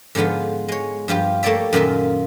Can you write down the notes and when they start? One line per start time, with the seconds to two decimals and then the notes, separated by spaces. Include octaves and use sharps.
0.15 G#2 D3 F3 B3 F4
0.68 G#3 C#5
1.08 G2 F3 F4 G4
1.43 A3 A#3 G4 C#5 D5 E5
1.73 F#2 A#2 D#3 F4 E5